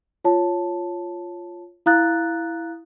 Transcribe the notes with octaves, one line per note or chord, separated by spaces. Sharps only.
F4 C#5 A5
E4 F5 A#5 D#6 F#6 A6